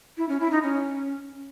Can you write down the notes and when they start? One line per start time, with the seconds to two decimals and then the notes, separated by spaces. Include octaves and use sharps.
0.18 E4
0.29 C#4
0.40 E4
0.51 D#4
0.63 C#4